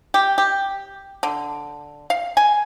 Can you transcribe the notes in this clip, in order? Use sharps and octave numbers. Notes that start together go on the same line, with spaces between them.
G4
G4
D3
F5
G#5